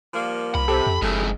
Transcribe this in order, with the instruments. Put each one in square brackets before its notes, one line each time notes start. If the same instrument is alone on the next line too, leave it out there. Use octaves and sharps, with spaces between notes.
[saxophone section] F3 G3 A#3
[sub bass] C2 [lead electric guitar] B5
[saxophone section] C3 [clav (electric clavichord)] G4 A4
[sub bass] F2
[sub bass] F#1 [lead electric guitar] F2 G#2 [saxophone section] G#3 A3 E4